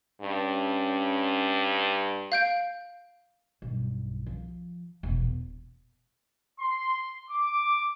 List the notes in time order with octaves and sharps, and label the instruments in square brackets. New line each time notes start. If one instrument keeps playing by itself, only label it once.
[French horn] G2 [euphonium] C#4
[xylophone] F5 G6 D7
[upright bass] B1 G2
F3
E1 A#1
[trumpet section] C6
D6